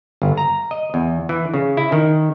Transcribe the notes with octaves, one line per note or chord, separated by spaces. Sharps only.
G1
A#5
D#5
E2
E3
C#3
E4
D#3